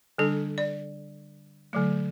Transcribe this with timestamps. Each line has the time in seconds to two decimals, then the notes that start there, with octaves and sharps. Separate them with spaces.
0.18 D3 G3 D4 A4
0.58 D5
1.73 D3 F#3 A3